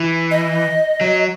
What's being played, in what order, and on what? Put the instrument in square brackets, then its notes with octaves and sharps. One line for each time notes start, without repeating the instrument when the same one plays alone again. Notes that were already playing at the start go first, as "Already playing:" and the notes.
Already playing: [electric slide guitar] E3
[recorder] D#5
[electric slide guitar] F#3